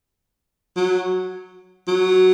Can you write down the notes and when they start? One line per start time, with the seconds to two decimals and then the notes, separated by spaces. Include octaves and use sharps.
0.76 F#3
1.87 F#3